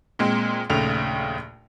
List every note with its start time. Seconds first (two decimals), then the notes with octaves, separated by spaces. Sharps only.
0.19 A#2 G#3 C4
0.70 A#1 D#2 C#3 A3 F7